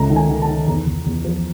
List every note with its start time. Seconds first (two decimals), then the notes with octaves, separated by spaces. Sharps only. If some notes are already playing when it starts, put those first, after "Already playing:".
Already playing: C#2 A3 A#5
0.10 D#3
0.16 G#5
0.29 D#3
0.42 A5
0.48 D#3
0.67 E2 A#5
0.87 E2
1.06 E2
1.24 F3